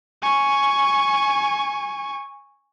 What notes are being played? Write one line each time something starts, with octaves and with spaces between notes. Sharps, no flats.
G#5 C#6